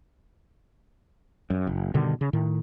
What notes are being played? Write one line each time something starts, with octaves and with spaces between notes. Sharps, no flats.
F#2
F#1
G2 B2 D3 D#3
C#3
A2 D#3